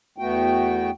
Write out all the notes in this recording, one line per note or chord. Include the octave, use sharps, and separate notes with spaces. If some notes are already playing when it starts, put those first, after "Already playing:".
E2 A3 B3 F#4 G5